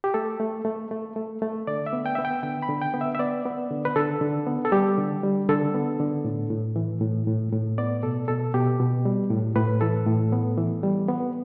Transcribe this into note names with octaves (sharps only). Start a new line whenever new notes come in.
G4
A3 A4
A3
A3
A3
A3
A3
D3 D5
E5
B3
G5
B3 E5
G5
D3 G5
B5
D3
G5
B3
E5
E5
B3 D5
B3
D3
B4
D3 A4
D3
B3
A4
G3 G4
D3
G3
D3 A4
B3
D3
A2
A2
E3
A2
A2
A2
B3 D5
B2 A4
B2 A4
B2 G4
B2
G3
A2
A2 B4
E3 A4
A2
B3
E3
G3
B3